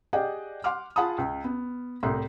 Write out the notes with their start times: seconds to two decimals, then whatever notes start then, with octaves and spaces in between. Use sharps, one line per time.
0.13 G4 G#4 D5 D#5 F#5 G5
0.64 F#5 C6 D6 F6
0.96 F4 G#4 F#5 A5 B5 D#6
1.18 C#2
1.44 B3
2.03 C2 A2 C6